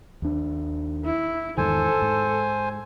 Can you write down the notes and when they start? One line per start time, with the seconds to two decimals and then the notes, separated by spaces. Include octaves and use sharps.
0.22 D#2 D4
1.05 E4
1.58 E2 G#2 D#3 A4 C5 G#5
2.02 G#2